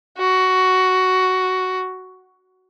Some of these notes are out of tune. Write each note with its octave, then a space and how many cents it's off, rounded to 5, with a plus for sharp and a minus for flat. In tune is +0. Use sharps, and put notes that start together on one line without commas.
F#4 +10